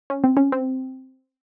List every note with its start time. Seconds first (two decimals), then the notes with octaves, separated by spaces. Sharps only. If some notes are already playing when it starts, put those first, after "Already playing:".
0.10 C#4
0.24 C4
0.37 C#4
0.52 C4